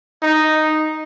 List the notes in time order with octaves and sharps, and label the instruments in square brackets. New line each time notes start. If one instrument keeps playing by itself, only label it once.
[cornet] D#4